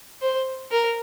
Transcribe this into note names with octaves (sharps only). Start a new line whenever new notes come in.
C5
A#4